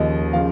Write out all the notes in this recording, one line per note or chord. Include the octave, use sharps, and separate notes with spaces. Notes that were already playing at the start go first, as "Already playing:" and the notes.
Already playing: D#2 C#3 F3 D#5
C#3 F3 F5